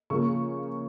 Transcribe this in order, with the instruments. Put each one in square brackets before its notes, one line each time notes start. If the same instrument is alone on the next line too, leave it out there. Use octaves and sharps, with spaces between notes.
[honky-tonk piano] C#3 F3 A#3 C#6